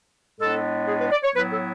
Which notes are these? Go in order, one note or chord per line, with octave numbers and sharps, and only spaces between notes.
A2 G#3 B3 D4 A4
G#4
B4
D5
C#5
A2 F#3 B3 E4 B4
A4